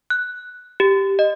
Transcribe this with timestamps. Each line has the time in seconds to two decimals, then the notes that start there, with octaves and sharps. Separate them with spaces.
0.10 F#6
0.80 G4
1.19 D#5